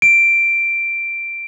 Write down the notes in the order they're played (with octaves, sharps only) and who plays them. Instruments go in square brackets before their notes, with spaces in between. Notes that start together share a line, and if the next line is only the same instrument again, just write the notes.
[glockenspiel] D7